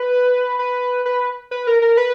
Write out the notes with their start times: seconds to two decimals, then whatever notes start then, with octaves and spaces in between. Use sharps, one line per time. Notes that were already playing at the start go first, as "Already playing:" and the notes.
Already playing: B4
0.59 B4
1.06 B4
1.51 B4
1.67 A#4
1.82 A#4
1.97 B4